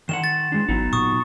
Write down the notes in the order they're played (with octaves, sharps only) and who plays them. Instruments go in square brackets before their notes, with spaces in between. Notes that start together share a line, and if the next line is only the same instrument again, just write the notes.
[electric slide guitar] D#3 D#5 F#5 [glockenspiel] E7
[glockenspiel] A6
[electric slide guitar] G#3 D4
[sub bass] G#1 [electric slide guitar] F#3 B3 D#4
[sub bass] A#2 [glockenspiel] C#6 D#6